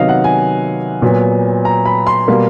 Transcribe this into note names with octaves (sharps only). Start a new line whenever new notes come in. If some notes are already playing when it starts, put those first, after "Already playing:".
Already playing: C3 D#3 F#3 B3 D#5 F5
F#5
G#5
A#2 F#3 B3
A#5
B5
C6
B2 G3 A#3